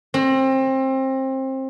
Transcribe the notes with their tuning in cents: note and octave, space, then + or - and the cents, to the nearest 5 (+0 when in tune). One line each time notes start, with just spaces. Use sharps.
C4 +25